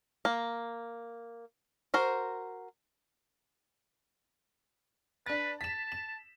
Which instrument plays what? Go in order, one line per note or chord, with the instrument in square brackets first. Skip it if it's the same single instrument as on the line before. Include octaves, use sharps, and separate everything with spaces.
[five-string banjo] A#3
F#4 A#4 C5
[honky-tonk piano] D4 A6 [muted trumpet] B4
[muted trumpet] A5 [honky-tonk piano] B6 E7
[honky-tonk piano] E7